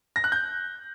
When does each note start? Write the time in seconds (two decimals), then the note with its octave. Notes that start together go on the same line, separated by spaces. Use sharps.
0.16 A#6
0.24 F#6
0.32 G6